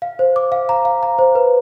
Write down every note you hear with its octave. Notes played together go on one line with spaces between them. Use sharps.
F5
C5
D6
F5
A#5
F5
A#5
C5
B4